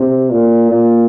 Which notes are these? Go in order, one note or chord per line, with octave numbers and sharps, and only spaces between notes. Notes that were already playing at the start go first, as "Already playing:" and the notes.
Already playing: C3
A#2
A#2